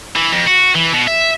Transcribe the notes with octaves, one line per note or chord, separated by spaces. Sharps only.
E3
F2
F#4
E3
B2
E5